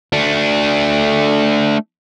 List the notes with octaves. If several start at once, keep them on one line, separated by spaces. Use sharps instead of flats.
A3 D4